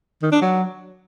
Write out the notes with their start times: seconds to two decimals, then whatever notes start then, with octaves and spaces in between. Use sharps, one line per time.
0.22 D#3
0.32 D4
0.41 F#3